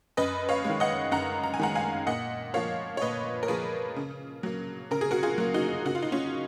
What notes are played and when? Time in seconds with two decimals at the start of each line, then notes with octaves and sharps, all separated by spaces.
0.17 F#2 B4 D#5
0.49 C#5 F5
0.64 G#3
0.69 D#3
0.80 D#5 F#5
1.11 F#2 F#5 A#5
1.43 A#5
1.54 G#5
1.60 D#3 G#3 F#5 A#5
1.75 F5 G#5
2.07 A#2 D#5 F#5
2.54 F3 A#3 C#5 F5
2.97 C#5
3.02 A#2 B4 D#5
3.43 A#4
3.48 F3 A#3 G#4 B4
3.96 C#3
4.43 F#3 A#3
4.91 C#3 A#4
5.01 G#4
5.11 F#4 A#4
5.23 F4 G#4
5.38 F#3 A#3
5.54 D#4 F#4
5.85 C#3 F#4
5.95 F4
6.02 D#4
6.12 C#4 F4